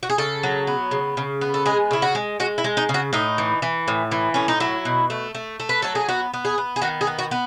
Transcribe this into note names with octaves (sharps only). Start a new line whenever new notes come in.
F#4
G#4
C#3 A4
F#3
B3
C#3
C#3
B3
A4
G#3 G#4
C#3 E4
F#4
G#3
G#3 F#4
E4
G#3
D#4
C#3
F#4
A2 D#4
E3
E3
A2
E3
A2 C#4
D#4
F#3 E4
B2
A3
A3
A3
B4
F#3 A4
G#4
B3 F#4
B3
G#4
B3
G#4
D#3 F#4
G#4
B3
F#4
B3